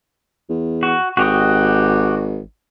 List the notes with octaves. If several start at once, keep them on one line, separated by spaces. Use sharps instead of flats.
E2
F#4
G#1 F#4 G4 D#5